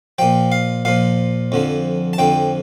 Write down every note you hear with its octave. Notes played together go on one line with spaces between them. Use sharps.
A#2 F3 G5
F5
A#2 F3 F5
F2 D3 F3
A5
F2 D3 F3 G5